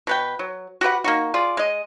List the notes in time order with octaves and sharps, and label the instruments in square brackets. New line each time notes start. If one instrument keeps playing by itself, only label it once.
[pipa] B2 B4 G5
F#3
F#4 G4 B4 F#5
A#3 D#4 F#4
F4 G#4 D5
G#3 D#5